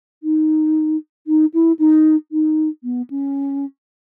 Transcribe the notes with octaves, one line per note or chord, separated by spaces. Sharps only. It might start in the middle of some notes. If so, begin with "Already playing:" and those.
D#4
D#4
E4
D#4
D#4
B3
C#4